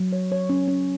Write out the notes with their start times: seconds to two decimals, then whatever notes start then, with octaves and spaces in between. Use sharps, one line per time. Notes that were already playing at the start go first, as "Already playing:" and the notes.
Already playing: F#3
0.13 C#5
0.32 C#5
0.49 C#4
0.68 C#4